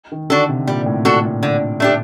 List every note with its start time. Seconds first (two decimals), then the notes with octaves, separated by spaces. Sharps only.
0.12 D#3
0.30 D3 D4 F#4 A4
0.49 C3
0.67 A#2 G3
0.86 A2
1.05 A#2 D4 F#4 A4
1.24 A#2
1.43 D3
1.80 A3 D4 G4